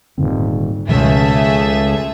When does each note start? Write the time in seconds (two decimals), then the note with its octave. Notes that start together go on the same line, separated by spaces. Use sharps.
0.18 D#1 G#2 D3 C4
0.89 C#2 B2 D#3 F3 A3 G#4 E5